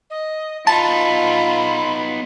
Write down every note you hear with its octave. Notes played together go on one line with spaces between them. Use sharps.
D#5
B3 D#4 F4 A5 B5